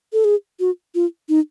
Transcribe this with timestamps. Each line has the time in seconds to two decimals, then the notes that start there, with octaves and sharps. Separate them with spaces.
0.13 A4
0.24 G#4
0.60 F#4
0.95 F4
1.29 D#4